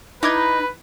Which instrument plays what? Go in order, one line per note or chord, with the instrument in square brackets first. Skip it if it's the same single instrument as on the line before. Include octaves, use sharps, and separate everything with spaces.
[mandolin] D#4 [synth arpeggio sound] E4 D6 G#6 [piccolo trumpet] B4 [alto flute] B5